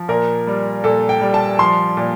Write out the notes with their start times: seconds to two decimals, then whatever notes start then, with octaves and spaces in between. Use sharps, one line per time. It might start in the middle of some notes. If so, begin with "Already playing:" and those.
Already playing: F3
0.09 A#2 A#4
0.47 G3
0.84 A#2 A4
1.09 G5
1.22 G3
1.34 A5
1.59 F3 C6
1.97 A#2